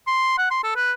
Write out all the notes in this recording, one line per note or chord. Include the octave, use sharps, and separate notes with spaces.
C6
F#5
C6
A4
B4